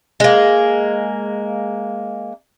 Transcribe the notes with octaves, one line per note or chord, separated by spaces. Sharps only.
G#3 A#3